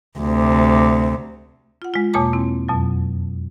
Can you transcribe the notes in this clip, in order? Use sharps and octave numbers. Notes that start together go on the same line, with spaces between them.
D2 C3
F4 F#5
G#3 F4
E2 B2 A#3 C#5 A5 D6
C4 E4
F2 B2 F#3